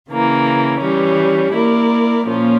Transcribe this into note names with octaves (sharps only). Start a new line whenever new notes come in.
C#3 E3 A#3
E3 G3 C#4
A#3 E4 A#4 D5
A#2 F3 A#3 C#4 F4